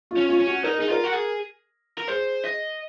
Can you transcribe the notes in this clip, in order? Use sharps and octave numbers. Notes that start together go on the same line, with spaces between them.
F4
C#4
F4
C#4
F#4
D#4 A#4
D#4 G#4
F4 A#4
F#4
G#4
A#4
G#4 C5
D#5